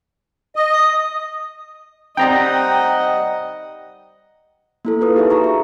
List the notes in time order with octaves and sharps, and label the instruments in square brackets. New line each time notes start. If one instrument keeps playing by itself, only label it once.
[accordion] D#5
[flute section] D#6
[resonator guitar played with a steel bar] G3 C4 D#4 [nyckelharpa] D#5 F#5 [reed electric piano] G5 A#5
[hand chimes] A#3 E4 A4
F4 B4 D#6
D#4 F4 G4 G#4 E5
F#4 E5 A#5 C#6
C#6